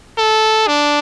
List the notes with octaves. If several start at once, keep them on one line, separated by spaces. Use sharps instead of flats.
A4
D4